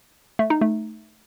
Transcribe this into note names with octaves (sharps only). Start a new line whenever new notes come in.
A3
D#4
A3